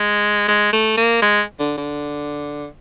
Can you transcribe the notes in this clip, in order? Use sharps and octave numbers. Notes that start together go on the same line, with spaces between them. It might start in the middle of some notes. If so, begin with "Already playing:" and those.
Already playing: G#3
G#3
A3
A#3
G#3
D3
D3